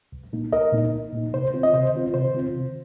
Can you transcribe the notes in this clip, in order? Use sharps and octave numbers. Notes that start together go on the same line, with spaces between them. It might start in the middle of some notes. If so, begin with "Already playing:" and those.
C2
A#2 A#3 D#4
C2 A#4 D#5
A#2 A#3 D#4
C2
A#2 A#3 D#4
C3 C5
D#3 C4 F4
D#5
C3 C5
D#3 C4 F4
C3 C5
D#3 C4 F4
C3